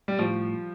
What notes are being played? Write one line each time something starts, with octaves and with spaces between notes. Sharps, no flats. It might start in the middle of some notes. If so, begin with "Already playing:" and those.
G3
A2 F3